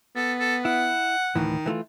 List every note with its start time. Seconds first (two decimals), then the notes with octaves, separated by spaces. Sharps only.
0.16 B3 A4
0.40 A4
0.65 E4 F#5
1.36 D2 A2 D#3 E3
1.66 E3 A3 F4